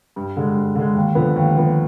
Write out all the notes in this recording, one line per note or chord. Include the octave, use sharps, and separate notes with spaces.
G2
D3 G#3
G2
D3 G#3
D#2
D3 F3 B3
D#2
D3 F3 B3